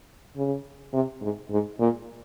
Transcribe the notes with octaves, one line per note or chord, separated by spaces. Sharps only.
C#3
C3
G#2
G#2
A#2